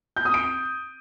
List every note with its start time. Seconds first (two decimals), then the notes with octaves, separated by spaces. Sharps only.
0.17 G6
0.25 D#6
0.34 D7